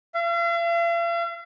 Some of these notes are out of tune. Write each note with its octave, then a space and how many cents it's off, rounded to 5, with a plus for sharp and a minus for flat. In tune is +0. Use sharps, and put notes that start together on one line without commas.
F5 -45